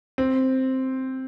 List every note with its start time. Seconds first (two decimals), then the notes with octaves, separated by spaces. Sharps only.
0.18 C4